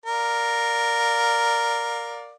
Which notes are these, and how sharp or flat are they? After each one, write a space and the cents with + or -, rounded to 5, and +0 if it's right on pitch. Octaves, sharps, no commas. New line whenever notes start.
A#4 +0 D5 +0 F5 +20